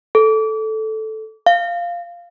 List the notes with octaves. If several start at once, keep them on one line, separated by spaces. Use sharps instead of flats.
A4
F5